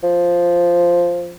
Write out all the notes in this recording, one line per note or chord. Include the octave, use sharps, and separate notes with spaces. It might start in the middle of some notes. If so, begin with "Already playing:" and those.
F3